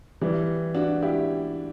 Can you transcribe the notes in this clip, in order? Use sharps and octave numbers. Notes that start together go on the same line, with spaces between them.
E3 G3
D4 F#4
E4 G4